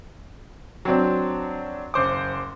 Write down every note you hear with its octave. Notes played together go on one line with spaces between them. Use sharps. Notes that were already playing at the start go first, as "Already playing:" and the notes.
F#3 C4 D4
F#1 C5 D6